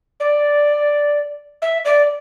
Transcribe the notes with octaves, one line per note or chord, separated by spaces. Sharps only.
D5
E5
D5